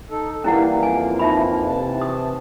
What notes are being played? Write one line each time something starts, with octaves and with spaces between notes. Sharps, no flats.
D#4 A4
E3 G3 A#3 C#4 E4 F#5
F2 G#5
D#4 E5 B5
C3 E3 A5
D#6